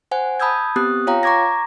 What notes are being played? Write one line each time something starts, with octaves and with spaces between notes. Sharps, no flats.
C5 F#5 G#5
A5 B5 D#6 E6 G6 G#6
B3 C4 G4 D#6 F#6
F4 C#5 F5 G5 A#5
A#5 C#6 D6 G#6 A#6